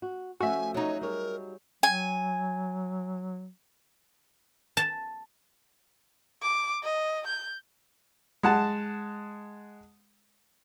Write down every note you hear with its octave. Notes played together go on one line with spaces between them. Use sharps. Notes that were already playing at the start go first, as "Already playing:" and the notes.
F#4
F3 A3 C#4 F#4 E5 G#5
F#3 D#4 C#5
G3 G#4 A#4 C#5
F#3 G#5
A5
D6
D#5
G6
G#3 F#5 A5